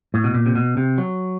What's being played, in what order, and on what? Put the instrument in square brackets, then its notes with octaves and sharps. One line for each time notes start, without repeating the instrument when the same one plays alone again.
[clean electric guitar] A2
B2
A#2
C3
B2
C3
F#3